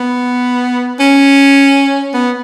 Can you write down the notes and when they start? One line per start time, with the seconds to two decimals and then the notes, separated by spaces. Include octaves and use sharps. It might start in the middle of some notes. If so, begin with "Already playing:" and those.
Already playing: B3
1.00 C#4
2.14 B3